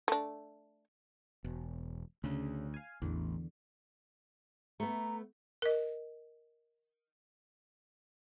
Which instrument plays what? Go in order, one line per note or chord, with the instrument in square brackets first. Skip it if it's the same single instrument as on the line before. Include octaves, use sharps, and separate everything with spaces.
[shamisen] A3 D4
[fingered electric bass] E1 [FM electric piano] B2
[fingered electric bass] D2 [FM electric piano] C#3
[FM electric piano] F5 G#5
[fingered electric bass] A1 [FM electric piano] E2 D3
[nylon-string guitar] A3 B3 [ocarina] A#5
[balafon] A#4 D#5